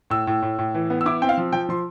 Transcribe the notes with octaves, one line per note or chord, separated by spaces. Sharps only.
A2 E6
A2
A2
A2
E3
B3
E6
E4 D6
C4 G5
F5
F3
F3 G5
F3 C6